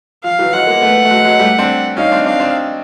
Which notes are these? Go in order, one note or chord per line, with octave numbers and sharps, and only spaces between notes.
F3 F5
E3 F#3
F#3 G#3 F#5
G#3 A#3
A3 B3
A3
F#3 G#3
F#3 G#3
G3 A3
C4 D4
C#4 D#4 F5
C4 D4
C4 D4 F5
C4 D4